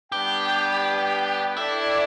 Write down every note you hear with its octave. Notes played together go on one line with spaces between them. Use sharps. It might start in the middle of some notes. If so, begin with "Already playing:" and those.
G3 B3 D4 G4 B4 G5
D4 E4 A4 D5 G5